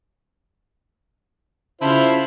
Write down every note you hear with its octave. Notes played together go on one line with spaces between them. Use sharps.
C#3 E4 F4 C5 A5